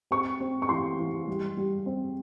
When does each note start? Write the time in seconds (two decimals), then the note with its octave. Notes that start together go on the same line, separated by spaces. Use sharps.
0.11 C4 C#6
0.40 C4
0.62 C#6
0.69 E3 C6
0.99 E3
1.28 G3
1.57 G3
1.86 C4